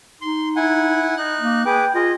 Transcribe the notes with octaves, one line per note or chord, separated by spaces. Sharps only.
D#4 C6
E4 F#5 G#5
D#4 F#6
A#3
G#4 B4 G5 D6
F4 G#4 D#5